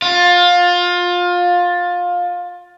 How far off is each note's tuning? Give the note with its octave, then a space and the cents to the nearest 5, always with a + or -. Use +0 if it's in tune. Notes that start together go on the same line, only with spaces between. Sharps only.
F4 +20